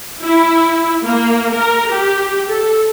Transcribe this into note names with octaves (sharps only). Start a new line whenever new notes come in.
E4
A#3
A#4
G4
A4